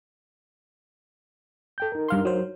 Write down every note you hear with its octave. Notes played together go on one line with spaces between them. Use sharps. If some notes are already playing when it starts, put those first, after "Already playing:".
A4 G5 G6
D#4 A#4
G2 F5 C6
F#3 C5